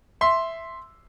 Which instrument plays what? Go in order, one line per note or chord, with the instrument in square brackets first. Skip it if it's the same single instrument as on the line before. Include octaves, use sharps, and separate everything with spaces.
[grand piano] E5 C6